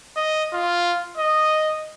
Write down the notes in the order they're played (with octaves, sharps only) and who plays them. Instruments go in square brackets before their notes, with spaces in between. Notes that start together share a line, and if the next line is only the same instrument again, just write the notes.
[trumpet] D#5
F4
D#5